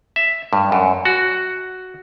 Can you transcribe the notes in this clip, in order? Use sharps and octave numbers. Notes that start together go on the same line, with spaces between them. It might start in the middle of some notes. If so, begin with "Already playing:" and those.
E5
G2
F#2
F#4